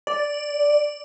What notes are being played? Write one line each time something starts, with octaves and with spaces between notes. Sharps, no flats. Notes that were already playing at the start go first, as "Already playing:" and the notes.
D5